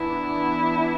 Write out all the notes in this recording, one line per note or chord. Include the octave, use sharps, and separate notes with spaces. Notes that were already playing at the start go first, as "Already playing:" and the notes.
Already playing: E3 B3 D4 E4